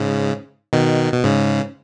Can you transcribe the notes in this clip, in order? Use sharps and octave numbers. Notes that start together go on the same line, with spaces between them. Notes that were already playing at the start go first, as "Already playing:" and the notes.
Already playing: G#2 C#3
B2 D#3
B2
G#2 C#3